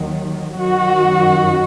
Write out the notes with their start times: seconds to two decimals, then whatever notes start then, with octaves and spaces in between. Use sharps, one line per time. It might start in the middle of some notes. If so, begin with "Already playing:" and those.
Already playing: D#2 D#3 F#3
0.58 F#2 D#3 F#3 F#4